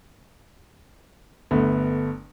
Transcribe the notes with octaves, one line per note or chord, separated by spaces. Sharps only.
G1 A3 B3